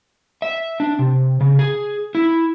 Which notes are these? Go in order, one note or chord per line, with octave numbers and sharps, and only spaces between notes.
E5
D4
C3
C#3
G#4
E4